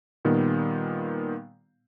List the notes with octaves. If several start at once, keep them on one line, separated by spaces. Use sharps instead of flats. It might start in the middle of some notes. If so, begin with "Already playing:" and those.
A#2 D#3 G3 B3